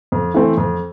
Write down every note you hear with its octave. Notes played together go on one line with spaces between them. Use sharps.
F2
E3 A3 C4
F2